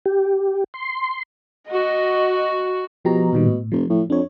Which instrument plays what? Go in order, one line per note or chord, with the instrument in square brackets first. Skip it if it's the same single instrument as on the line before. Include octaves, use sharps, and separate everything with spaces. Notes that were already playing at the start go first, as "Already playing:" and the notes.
[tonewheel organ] G4
C6
[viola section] F#4 [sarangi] D#5
[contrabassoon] B2 [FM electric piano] F3 G4 A#5
[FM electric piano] A#2 D#3 G3
A2
[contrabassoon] F1 [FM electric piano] F3
[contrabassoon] A2
[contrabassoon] F2 [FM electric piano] D4 C#5